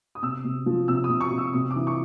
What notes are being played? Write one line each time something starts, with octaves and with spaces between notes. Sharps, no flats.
D#6
C3 E6
C3
F3
C3 E6
D#6
C3
C#6
C3
E6
C3 D#6
D6
E3
C#6